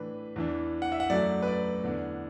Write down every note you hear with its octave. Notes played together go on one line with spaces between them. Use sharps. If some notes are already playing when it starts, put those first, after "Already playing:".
Already playing: A2 E3 D4 B4
E2 E3 D4
F#5
E5
F#5
F#2 F#3 A3 D5
B4
D5
E2 D3 B3 D4